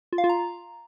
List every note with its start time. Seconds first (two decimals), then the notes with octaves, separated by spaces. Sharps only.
0.13 F4
0.18 F5
0.24 F4
0.29 A#5